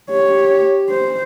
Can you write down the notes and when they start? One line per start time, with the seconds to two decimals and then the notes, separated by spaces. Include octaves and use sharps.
0.10 G4 C#5
0.90 C5